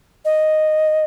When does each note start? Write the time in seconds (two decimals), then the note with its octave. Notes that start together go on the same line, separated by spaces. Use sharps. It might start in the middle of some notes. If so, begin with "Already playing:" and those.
0.25 D#5